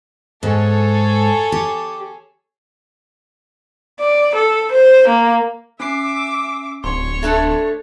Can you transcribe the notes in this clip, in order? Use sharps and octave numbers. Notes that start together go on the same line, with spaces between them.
G#2 G#4 A4 C#5
G4
D5
A4
C5
A#3
C#4 E5 D6 C7
D1 C#5 C6
A3 D4 A4